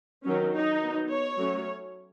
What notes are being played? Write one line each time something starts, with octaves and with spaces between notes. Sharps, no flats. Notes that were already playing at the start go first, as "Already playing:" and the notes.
D#3 F#3 C#4
D#4
F#3 B3
C#5
F#3 A3 C#4